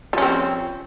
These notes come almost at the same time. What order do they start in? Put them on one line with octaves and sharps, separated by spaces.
F3 C#4 C4